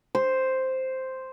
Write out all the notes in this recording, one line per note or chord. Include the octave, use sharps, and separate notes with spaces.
C5